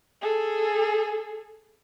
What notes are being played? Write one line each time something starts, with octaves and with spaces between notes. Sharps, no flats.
G#4 A4